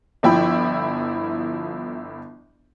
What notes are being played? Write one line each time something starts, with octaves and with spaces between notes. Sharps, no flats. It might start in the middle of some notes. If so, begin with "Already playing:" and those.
G1 F3 E4 G5 B5